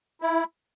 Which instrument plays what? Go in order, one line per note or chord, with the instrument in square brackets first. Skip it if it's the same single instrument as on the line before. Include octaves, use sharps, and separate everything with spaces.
[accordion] E4